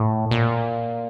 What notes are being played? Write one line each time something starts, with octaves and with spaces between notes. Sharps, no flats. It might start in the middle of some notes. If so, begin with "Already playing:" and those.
Already playing: A2
A#2